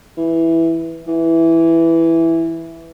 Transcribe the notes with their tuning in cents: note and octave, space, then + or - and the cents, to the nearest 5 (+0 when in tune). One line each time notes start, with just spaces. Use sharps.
E3 -5
E3 +0